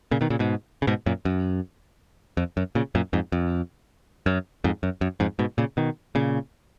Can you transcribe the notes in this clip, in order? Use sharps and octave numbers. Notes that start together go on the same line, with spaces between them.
A#2 C#3
B2 D#3
A#2 C#3
G#2 B2
C#3
G#2 B2
F#2 A#2
F#2
F2
F#2
A#2 C#3
F#2 A#2
F2 G#2
F2
F#2
F2 G#2
F#2
F#2
F2 G#2
G#2 B2
A#2 C#3
B2 D#3
A#2 C#3